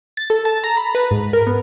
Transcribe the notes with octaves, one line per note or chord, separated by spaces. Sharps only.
A6
A4
A5
A#5
B5
B4
G#2
A#4
B3